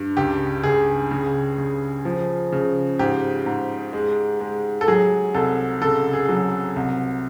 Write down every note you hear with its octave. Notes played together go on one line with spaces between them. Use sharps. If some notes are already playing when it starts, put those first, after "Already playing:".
Already playing: G2
C#2 G4
C#2 G#4
C#3
C#3
F3
C#3
G#2 G4
G#2
G#3
G#3
A4
F#3 G#4
C2 A4
C#3 A4
G#4
F#3
C2